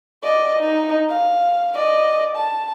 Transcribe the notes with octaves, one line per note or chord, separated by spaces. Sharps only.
D5 D#5
D#4
F5
D5 D#5
A5